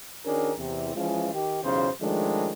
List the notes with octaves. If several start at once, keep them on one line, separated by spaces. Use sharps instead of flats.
D#3 C#4 D4 F#4 G#4 A#4
E2 C3
E3 F3 G#3 C#4 F4
D#3 G4
B1 E2 C#3 C#4 F4 C5
D#3 F3 G#3 A3 C#4 D4